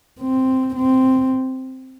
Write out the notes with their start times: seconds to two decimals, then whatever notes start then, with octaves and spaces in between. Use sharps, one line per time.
0.20 C4
0.76 C4